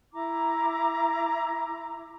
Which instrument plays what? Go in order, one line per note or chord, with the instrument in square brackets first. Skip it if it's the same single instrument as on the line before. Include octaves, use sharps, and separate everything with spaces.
[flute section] E4 A#5 D6